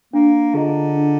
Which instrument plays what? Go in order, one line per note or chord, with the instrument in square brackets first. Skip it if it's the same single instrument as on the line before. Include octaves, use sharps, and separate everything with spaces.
[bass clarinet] A#3 [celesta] D4
[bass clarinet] D3 [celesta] F4 G#4 D#5 A#5
[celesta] D4